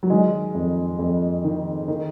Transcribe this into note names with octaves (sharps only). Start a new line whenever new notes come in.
F#3
D#3 G#3
F2
F2
D#3
D#3